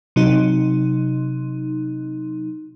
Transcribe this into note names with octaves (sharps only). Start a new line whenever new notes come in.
C3 F#3 D#4